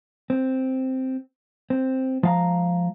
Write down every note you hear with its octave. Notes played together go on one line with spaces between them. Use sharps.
C4
C4
F3 G#3 F5 G5 A#5